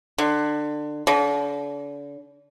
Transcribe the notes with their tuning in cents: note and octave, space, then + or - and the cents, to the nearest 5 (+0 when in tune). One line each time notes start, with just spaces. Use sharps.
D3 +25
D3 -40